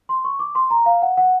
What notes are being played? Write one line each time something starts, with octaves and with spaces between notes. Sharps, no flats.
C6
C#6
D6
C6
A#5
F5
F#5
F#5